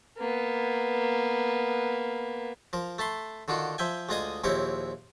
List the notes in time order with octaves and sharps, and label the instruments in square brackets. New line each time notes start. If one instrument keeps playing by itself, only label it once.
[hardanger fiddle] A#3 B3
[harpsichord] F3 A#4
A3 A5 B5 C6
D3 D#3 F4 F#4
F3 E5 G5 G#5
D2 G#3 F4 D#5 G#5 D#6
A#1 D#2 C4 E4 A#4 C#5